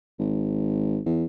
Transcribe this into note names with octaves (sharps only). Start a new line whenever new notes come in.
G#1
E2